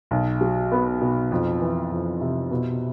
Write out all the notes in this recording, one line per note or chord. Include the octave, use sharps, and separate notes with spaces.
B1
F#3
B3
B2
F2
E3
F2
C3
B2